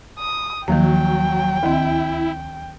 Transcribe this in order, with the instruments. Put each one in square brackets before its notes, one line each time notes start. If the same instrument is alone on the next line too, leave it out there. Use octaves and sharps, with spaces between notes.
[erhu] D#6
[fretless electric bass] D#2 [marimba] D#3 F3 A#3 [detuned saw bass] F#3 [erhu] G5
[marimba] D2 D#3 C4 [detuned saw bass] E4